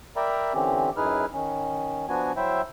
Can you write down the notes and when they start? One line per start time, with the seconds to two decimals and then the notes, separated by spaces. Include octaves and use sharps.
0.16 A#4 D5 E5 G5 A#5 B5
0.54 D3 E3 C4 C#4 G4
0.97 F#2 D#4 E4 G#4 B4 F6
1.33 D#3 C#4
2.09 F3 B3 D4 F#4 G#5
2.37 F#3 E4 C5 E5 G5